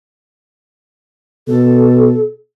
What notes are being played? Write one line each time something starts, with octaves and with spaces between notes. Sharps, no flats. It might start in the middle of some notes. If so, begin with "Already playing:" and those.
B2 A4